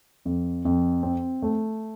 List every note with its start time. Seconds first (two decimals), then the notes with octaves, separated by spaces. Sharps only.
0.25 F2
0.65 F2
1.03 C4
1.42 A3